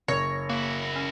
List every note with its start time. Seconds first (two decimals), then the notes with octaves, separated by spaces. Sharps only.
0.08 F#1 C#5 A#6
0.49 A#3 E4 F#4
0.96 C#4